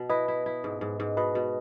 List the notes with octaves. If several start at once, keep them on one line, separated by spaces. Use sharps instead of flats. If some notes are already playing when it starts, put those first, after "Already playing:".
Already playing: B2
E4 B4 D#5
E4
E4
G#2
G#2
G#2
B2 B4 D#5
B2